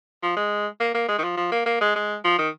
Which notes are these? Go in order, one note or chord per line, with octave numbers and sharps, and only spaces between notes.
F3
G#3
A#3
A#3
G#3
D#3
F3
F3
A#3
A#3
G#3
G#3
F3
D#3